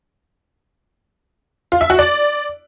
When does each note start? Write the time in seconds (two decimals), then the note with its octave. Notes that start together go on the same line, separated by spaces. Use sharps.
1.72 F4
1.81 E5
1.90 F#4
1.99 D5